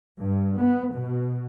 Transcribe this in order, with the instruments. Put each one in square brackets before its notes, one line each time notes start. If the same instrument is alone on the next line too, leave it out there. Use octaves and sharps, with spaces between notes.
[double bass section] G2
B3
B2